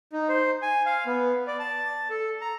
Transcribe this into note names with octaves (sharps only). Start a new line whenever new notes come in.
D#4
C5
G#5
F5
B3
D5
A5
A4
A#5